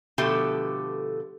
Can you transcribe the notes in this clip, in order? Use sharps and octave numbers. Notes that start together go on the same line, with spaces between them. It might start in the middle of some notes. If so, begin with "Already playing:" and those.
B2 D3 F3 A3 G4 A4